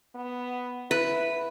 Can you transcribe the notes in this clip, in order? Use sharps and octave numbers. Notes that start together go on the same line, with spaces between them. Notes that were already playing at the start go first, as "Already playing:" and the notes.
B3
E4 B4